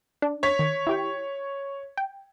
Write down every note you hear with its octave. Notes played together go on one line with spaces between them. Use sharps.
D4
C#5 B6
D#3
E4 G4 G5
G5